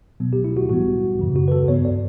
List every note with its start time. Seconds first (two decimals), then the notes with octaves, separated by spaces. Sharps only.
0.20 B2 F#3 B3
0.33 G4
0.44 E4
0.57 F#4
0.69 A2 E3 G3 B3 F#4
1.19 F#2 C#3 E3
1.36 F#4
1.48 B4
1.52 A4
1.68 G2 E3 B3 C#5
1.85 D5